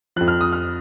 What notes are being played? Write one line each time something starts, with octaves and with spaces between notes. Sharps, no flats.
F2 F3 F#6
F6
D#6
F6